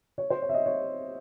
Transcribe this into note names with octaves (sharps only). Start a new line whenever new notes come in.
C#5
C5
C#5
E5
D#5
C#5